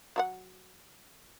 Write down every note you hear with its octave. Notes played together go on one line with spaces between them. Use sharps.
F#3 F#4 F#5